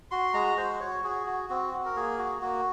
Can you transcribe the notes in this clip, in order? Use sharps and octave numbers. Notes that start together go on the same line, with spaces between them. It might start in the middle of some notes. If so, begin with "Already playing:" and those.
F#4 C6
G#3 A#5
F#4 C5
F#4 C#5
F#4 G#4
F#4
C4 F#4
F#4
A#4
A#3 G#4
F#4
A#3 F#4